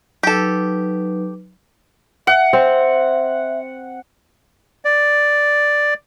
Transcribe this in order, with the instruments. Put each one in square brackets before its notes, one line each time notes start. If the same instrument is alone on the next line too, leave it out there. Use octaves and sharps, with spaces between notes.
[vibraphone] F#3 D#4 B4 [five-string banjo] G4 A4
[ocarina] E5 [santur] F#5
[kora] C4
[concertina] D5